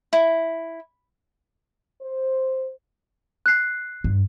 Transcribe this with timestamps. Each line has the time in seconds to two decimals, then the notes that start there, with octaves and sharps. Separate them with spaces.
0.13 E4
2.02 C5
3.46 F#6 C7
4.04 G2